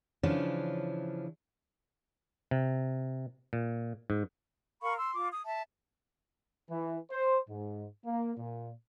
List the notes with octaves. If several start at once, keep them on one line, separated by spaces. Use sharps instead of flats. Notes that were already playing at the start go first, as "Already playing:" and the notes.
C#3 E3 F3 C#4 D4
C3
A#2
G#2
A#4 F5 B5 C#6
C6 E6
F4 D6
D#6
E5 A5
E3
C5
G#2
A#3
A#2